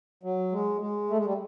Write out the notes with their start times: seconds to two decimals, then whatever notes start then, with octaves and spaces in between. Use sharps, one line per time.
0.23 F#3
0.52 G#3
0.81 G#3
1.10 A3
1.18 G#3
1.26 G3